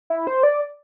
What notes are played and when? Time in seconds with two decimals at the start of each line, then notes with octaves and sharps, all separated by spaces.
0.10 E4
0.27 C5
0.43 D5